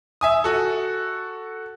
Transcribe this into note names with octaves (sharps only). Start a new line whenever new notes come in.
E5 G#5 D#6
F#4 A4